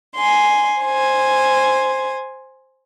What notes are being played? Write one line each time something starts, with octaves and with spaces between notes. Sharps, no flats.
G#5 C6
C5 G#5